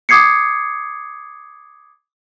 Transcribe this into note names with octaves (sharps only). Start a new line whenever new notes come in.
D6 D#6 G#6 C7 C#7